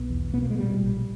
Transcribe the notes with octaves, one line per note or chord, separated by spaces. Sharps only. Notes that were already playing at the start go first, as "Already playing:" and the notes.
Already playing: B1 B3
E2
B2 B3
A#3
G#3
A#2 G3
A#1